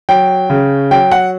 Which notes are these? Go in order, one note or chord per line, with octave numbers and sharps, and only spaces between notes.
F#3 G5
C#3
F#3 G5
F#5